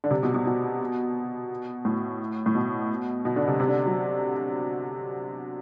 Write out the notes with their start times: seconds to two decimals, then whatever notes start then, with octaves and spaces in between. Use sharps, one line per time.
0.04 D3
0.11 C3
0.23 B2
0.34 B2
0.45 B2
1.85 A2
2.46 A2
2.55 B2
3.25 B2
3.36 D3
3.48 C3
3.60 C3
3.68 D3
3.86 F#3